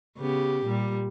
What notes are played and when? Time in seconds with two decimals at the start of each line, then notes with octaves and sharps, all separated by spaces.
0.18 C#3 B3 G4
0.65 A#2 G3